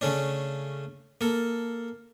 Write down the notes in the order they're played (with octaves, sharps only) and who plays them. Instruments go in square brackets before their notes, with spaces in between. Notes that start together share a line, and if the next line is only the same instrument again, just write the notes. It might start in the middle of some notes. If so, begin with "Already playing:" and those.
[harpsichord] C#3 A3 C#4 D4
A#3 A4